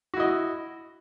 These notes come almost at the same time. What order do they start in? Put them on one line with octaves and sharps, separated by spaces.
F#4 E4 D#5